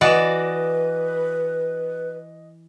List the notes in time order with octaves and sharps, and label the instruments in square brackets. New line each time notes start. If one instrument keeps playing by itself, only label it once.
[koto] E3 F#4 D5 [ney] B4 [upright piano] D#5 E7